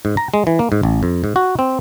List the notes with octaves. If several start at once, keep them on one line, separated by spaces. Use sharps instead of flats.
G#2
A#5
G#3
E3
A#3
G#2
A1
F2
G#2
F#4
C4